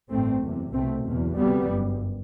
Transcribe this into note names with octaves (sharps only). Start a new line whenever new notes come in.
A1 G2 A3 C4
F#1 E2 C3
C2 B2 A3 C4
F#1 E2 B2
D2 C3 G3 B3
G1 F#2